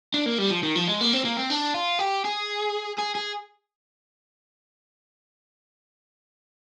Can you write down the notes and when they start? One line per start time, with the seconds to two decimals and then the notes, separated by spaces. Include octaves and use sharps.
0.14 D4
0.26 A#3
0.38 G3
0.50 F3
0.63 D#3
0.75 F3
0.88 G#3
1.01 A#3
1.13 C4
1.25 A#3
1.37 C4
1.50 D4
1.74 F4
1.99 G4
2.25 G#4
2.99 G#4
3.15 G#4